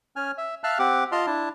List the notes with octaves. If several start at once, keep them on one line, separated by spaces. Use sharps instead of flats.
C#4 G#5 F6
E5
E5 F5 A5 F6 F#6
C4 G4 F#5 D6
F4 D#5 A5 C6 F6
D4 E4 A5